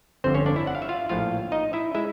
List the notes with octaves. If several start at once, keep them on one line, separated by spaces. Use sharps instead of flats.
G1 F2 D3 C4 C5
C#4 C#5
D4 D5
E4 E5
F#5
F5
E5
F4 F5
A#1 A2 F3 F4 F5
D#4 D#5
E4 E5
G#3 E4 E5